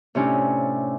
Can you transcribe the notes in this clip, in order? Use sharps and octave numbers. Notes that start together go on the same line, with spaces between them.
A2 C3 C#4 D4